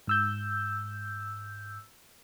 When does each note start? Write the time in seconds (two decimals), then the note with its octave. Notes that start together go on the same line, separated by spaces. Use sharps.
0.07 G#2 E6 G6